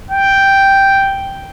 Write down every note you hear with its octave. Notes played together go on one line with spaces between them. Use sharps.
G5